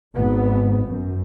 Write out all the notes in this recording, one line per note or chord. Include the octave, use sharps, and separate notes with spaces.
G#1 G#2 B3
F#2